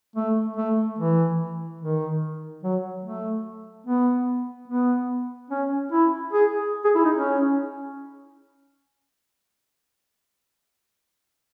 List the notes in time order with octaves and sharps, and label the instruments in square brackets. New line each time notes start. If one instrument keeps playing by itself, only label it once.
[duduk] A3
A3
E3
D#3
F#3
A3
B3
B3
C#4
E4
G#4
G#4
E4
D#4
C#4